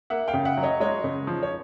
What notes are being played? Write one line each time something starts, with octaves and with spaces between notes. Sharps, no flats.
A#3 E5 F#5
F5 G5
C#3
E5 F#5
F#3
C#5 D#5
G#3 C#5 D#5
C#3
F3
C#5